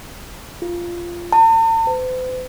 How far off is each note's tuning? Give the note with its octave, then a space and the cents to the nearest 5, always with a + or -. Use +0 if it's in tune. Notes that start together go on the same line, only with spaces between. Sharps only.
F4 -10
A5 +45
C5 -45